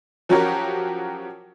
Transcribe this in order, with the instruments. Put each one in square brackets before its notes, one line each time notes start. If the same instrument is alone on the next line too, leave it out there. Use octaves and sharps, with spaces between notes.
[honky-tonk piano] F3 F#3 C#4 F#4 G4 A#4